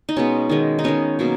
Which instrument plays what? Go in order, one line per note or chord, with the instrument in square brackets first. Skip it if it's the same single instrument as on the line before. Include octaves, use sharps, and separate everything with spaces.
[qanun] D#4
B2 G#3 B3 C#4
D#3 G#3 B3
D#4
D#3 G#3 B3 C#4
B2 F#3 A#3